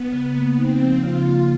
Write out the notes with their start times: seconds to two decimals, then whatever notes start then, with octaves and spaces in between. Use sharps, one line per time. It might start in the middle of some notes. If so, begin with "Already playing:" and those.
Already playing: B3
0.12 C#3
0.34 A#3
0.57 C4 D#4
0.80 F3
1.02 C#3 F4
1.25 A#3